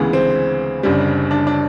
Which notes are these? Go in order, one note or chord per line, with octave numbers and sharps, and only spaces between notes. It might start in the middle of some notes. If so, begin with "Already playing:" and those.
Already playing: D2 C#3 E3 G#3 B3
C4
F#1 F#2 D3 G3
D4
D4